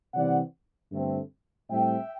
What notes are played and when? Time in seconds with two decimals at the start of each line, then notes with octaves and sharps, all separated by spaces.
0.13 C3 E3 G3 C4 D5 F#5
0.92 G2 D3 A3 C4
1.70 A2 G3 C4 E5 G5